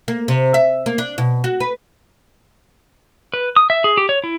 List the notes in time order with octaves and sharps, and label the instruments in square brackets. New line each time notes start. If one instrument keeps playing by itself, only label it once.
[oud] A#3
C3
E5
A#3
D4
B2
F#4
B4
[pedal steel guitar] B4
D#6
E5
G#4
G4
C#5
E4